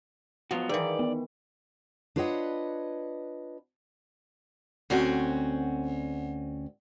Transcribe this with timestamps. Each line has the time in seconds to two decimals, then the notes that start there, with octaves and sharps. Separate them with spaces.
0.51 F3 F#3 G#3 B3 F4 F#4
0.69 D#3 E3 G#4 B4 D5 F5
0.99 B3
2.16 D4 F4 B4 C#5 D#5 F#5
4.90 D2 C4 C#4 F#4